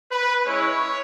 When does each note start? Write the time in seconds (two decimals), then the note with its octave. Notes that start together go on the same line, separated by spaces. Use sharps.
0.12 B4
0.46 G#3 C#4 E4 C#5